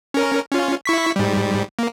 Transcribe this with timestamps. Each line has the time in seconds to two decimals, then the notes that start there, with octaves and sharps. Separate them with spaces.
0.14 C#4 A#4
0.51 C#4 F4
0.86 E4 C#6 B6
1.16 G#2 G3
1.79 A#3